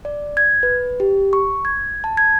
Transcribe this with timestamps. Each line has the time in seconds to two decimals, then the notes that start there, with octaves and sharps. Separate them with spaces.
0.05 D5
0.37 G#6
0.63 B4
1.00 G4
1.33 C#6
1.65 G#6
2.04 A5
2.17 G#6